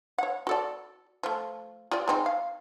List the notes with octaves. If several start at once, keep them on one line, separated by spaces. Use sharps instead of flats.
C#5 F#5
F#4 A4 D5
F3 A3
F4 G4 D5
G#3 C4 D#4
F5